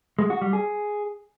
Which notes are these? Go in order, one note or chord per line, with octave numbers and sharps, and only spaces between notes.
G#3
F#4
G3
G#4